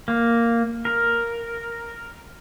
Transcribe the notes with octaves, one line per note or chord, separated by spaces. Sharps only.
A#3
A#4